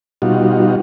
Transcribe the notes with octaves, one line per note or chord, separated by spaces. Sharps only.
B2 G3 D#4 F4 F#4